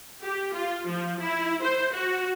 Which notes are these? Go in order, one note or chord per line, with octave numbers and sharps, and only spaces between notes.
G4
F4
F3
E4
C5
F#4